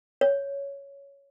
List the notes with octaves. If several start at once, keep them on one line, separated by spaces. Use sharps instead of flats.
C#5